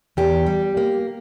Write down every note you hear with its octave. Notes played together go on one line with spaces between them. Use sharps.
E2 G4
G3
A#3